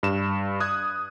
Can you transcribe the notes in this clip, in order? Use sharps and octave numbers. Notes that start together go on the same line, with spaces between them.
G2 E7
D#6 F#6 G#6